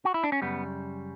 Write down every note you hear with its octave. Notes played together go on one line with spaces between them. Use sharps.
F#4
E4
D4
C#4
F#2 C#3 G3 B3